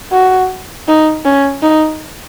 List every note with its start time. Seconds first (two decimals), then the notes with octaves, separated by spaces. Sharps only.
0.12 F#4
0.88 D#4
1.25 C#4
1.62 D#4